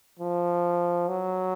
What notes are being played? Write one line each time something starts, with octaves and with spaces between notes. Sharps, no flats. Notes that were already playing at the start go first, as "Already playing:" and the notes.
F3
F#3